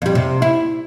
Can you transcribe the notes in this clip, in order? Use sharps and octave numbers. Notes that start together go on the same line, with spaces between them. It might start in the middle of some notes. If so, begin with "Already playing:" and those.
F2 G3
C3
E4